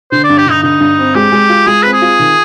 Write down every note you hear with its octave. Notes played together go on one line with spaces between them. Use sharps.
D3 C5
D5
G2
G4
D3 D#4
D3 D#4
G2
C4
G#3 G4
G#3
F4
G#3 G#4
C4 B4
G#4
F4
D#3